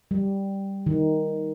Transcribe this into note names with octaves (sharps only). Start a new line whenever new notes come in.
G3
D#3